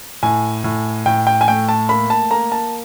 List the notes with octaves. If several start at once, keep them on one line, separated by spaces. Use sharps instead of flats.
A2 G#5
A2
A2 G5
G5
G#5
A3 G5
A5
A#3 B5
A5
A#3 A#5
A5